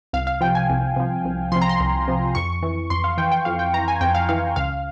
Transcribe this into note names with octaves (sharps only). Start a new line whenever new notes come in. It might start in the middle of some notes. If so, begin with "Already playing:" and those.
C2 F5
F5
C3 F3 G5
G#5
C2
C3 F3
C2
C3 F3 C6
A#5
C6
C2
C3 F3
F2 C#6
E3
F2 C6
F5
E3 G5
G5
F2 F5
G5
E3 A#5
G#5
F2 G5
F5
E3 F5
C#2 F5